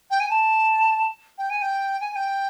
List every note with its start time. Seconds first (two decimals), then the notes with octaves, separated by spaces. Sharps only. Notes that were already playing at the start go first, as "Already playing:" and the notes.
0.10 G5
0.20 G#5
0.29 A5
1.38 G5
1.49 G#5
1.61 G5
2.00 G#5
2.11 G#5
2.15 G5